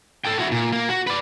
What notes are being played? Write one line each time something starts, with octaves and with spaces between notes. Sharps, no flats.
A4 G5
E4 F#4
A#2
A#3
F#4
B4 D5